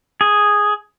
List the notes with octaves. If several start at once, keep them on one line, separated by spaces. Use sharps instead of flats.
G#4